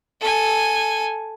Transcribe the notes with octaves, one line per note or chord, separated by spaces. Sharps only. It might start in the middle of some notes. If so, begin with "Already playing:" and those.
A4 G#5